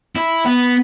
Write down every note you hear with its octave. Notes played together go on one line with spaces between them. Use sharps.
E4
B3